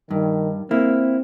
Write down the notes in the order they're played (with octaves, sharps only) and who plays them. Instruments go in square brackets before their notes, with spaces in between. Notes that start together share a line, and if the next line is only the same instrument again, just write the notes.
[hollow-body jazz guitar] G2 [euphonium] D#3
[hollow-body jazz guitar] A#3 E4 [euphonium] C4